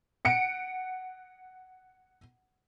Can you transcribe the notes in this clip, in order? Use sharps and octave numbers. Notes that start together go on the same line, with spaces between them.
F#5 C#7 D7